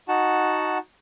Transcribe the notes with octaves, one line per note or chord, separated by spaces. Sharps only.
D#4 F#4 F#5 A5